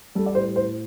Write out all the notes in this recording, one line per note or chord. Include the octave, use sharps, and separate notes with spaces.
G3 A4
D5
A2 C5
A2 C5